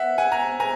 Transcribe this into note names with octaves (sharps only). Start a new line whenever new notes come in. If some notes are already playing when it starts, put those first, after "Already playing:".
Already playing: E5 F#5
F#5 G#5
G#5 A#5
G#5 A#5